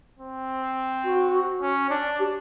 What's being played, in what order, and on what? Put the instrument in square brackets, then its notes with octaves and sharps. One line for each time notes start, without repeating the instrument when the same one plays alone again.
[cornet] C4
[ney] F#4
[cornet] C#4
D4
[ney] G4